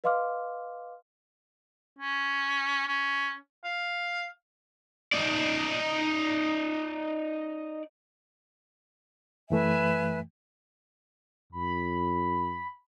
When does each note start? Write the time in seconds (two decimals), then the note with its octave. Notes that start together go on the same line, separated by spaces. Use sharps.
0.04 B4 D#5 F5 C6 D6 F6
1.99 C#4
2.88 C#4
3.64 F5
5.13 D#4 D5
9.50 F#2 E3 A3 B4 E5 G#5
11.52 F2 B5